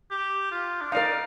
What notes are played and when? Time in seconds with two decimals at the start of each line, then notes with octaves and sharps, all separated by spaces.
0.11 G4
0.52 F4
0.81 D4
0.92 D#4 A#4 D5 F5